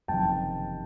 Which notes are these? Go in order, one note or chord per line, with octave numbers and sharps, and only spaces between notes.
F#1 F2 C3 D#3 G5 A5